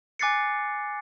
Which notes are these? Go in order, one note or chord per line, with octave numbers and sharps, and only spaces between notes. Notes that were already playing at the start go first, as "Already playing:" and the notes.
G#5 D6 F#6 A6 C7 C#7